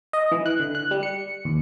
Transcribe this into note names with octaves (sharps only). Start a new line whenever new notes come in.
D#5
E3
F#6
D3
F#6
G3
C#7
D#2